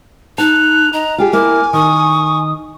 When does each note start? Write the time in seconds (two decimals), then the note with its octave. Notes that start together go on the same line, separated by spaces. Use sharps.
0.38 D#4 A5 F#6 F7
0.93 D#5 A#5
1.18 F4 G4 G#4 G#5
1.33 A#3 E4 D6 F6
1.73 D#3 C#6 D#6